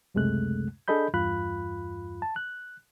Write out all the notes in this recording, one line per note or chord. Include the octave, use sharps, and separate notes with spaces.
C#2 F#2 C3 G#3 A3 F#6
D4 G#4 A4 D#5 B5 G6
E2 G2 F4 B5 F#6
A5
F#6